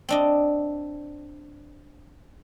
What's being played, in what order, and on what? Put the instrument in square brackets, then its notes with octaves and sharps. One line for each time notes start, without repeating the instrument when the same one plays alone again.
[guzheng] C4 D4 D#5